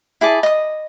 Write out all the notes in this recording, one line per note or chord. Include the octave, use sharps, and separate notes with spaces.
E4 G#4 D5 A5
D#5 D#6